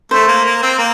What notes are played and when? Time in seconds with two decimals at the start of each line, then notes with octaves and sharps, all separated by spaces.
0.11 A3 C5
0.28 A#3
0.45 A#3
0.62 C4
0.79 A#3